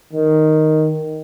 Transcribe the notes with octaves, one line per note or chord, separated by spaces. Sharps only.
D#3